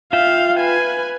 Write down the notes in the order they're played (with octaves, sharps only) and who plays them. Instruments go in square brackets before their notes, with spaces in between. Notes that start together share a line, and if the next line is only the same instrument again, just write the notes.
[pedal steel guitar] F4 E5 G5 [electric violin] F5
[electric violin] B4 G#5